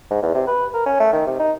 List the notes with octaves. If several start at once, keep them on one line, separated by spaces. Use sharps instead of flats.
G#2
E2
C3
B4
A#4
C#4
A3
D#3
C3
D#4